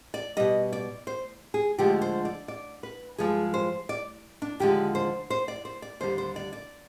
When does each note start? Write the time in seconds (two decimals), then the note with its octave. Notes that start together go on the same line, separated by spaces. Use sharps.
0.14 D5
0.37 B2 G3 D#5
0.73 D5
1.07 C5
1.54 G#4
1.78 D2 D3 F3 G#3 G4
2.02 C5
2.25 D5
2.48 D5
2.83 B4
3.18 G2 F3 G#3 G#4
3.54 C5
3.89 D5
4.42 D4
4.60 D#2 D3 F3 G#3 G4
4.95 C5
5.30 C5
5.48 D5
5.65 C5
5.82 D5
6.00 D#2 D3 G3 C5
6.18 C5
6.36 D5
6.53 D5